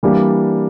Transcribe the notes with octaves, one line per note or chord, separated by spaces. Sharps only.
E3 G3 A#3 D4 G4